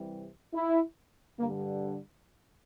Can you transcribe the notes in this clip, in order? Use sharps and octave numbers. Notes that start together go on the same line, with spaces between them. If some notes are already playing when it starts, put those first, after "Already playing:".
Already playing: C2 C3 E3 G3
E4
G2 D3 G3 A#3